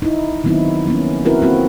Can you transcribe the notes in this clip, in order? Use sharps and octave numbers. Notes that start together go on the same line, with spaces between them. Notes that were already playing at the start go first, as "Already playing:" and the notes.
D#4 E4
D#3 F#3 B3 C4 D#4 E4
F3 A#3 B3 C#4
C4 E4 F#4 A#4 B4
A#3 C4 F4 F#4